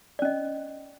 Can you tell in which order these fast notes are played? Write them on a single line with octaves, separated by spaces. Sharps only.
D5 C#4 D#5